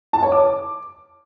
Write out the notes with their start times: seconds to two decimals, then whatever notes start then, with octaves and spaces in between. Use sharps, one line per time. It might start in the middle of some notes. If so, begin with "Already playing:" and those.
0.13 A5
0.23 C#5
0.32 D6